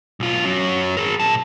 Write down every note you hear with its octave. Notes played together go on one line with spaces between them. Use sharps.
B1 F4
F#3 C#4
G#4 A#4
A#2 A5